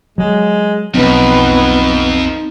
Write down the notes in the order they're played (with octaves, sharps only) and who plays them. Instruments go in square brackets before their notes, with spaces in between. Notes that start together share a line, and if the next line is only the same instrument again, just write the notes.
[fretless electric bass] F#3 [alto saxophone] G#3
[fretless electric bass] B1 F#3 C4 [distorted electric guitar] F2 [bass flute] B3 [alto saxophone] D#4